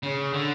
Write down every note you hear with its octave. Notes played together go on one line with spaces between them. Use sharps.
C#3
D3